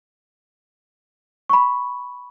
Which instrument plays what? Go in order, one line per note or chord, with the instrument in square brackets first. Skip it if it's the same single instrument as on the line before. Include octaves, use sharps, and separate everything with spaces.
[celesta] B5 C#6